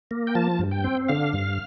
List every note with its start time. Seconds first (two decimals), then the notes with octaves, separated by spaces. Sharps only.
0.11 A#3
0.27 G5
0.35 F3 A5
0.59 G2
0.71 G5
0.84 C4
1.08 D3 F5
1.33 G2